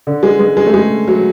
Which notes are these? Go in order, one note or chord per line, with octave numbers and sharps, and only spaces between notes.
D3
G#3
G#3
G#3
A3
G#3
F#3